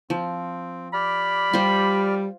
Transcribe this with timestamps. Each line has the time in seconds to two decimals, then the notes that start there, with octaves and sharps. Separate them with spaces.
0.10 F3 C4
0.94 G4 D5 B5 F6
1.53 G3 F4 C5